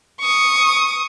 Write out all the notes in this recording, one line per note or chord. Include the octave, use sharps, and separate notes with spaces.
C#6 D#6